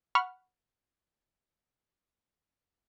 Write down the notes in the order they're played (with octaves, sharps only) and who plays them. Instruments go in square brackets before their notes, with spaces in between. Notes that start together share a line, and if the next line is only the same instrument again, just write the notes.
[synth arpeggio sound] F#5 B5 C#6 F6